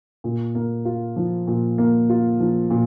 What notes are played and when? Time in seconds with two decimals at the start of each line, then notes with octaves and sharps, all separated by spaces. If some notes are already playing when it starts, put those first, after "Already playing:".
0.24 A#2
0.55 A#3
0.85 F4
1.16 F3
1.48 A#2
1.78 A#3
2.10 F4
2.40 F3
2.71 A#2